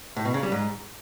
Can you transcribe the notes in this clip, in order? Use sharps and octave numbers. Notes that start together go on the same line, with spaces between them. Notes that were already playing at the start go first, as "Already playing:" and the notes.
A2
B2
C#3
G3
G#2